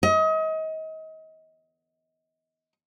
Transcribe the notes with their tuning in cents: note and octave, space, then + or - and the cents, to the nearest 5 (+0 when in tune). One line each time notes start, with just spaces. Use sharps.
D#5 +30